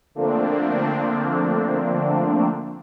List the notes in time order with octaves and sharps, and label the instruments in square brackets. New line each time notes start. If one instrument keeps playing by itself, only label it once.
[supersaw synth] D3 F3 A3 A#3 C4 D4